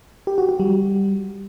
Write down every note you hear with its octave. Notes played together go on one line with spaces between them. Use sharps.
G4
F#4
F#4
G3